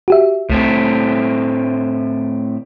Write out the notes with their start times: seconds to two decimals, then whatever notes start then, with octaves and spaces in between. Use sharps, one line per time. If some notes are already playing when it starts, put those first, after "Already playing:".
0.08 F#4 G4 E5
0.49 C2 A2 A3 C4